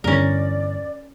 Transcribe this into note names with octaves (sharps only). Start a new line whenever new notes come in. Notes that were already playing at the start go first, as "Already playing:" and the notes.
E2 G2 D3 C#4 A#4 D5